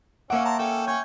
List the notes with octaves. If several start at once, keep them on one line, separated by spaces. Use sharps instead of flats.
A#3 C#4 C#5 E5 F#5 D6
A5 A#5 C6
C#4 A4 G5
C#4 C#5 G#5 G6